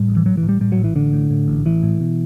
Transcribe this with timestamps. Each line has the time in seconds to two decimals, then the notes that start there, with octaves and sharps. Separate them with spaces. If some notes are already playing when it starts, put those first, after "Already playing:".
Already playing: A2 G3
0.08 A1
0.17 E3
0.25 A1 F#3
0.37 E3
0.43 A2
0.49 G3
0.60 A2 G3
0.72 F#3
0.78 A1
0.84 E3
0.95 A1 D3
1.13 A2
1.30 A2
1.48 A1
1.65 A1 E3
1.83 A2
2.00 B2